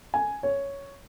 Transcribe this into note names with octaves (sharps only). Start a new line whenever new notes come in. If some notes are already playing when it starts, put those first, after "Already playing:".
G#5
C#5